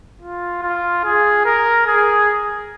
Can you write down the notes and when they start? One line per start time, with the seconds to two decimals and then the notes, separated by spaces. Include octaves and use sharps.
0.21 F4
0.62 F4
1.04 G#4
1.45 A#4
1.86 G#4